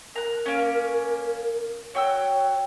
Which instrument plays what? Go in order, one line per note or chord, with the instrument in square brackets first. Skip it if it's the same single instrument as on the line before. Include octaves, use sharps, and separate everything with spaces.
[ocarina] A#4 [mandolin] A#5 F#6
[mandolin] A#3 C#4
[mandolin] F#4 G5 E6 [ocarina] C#5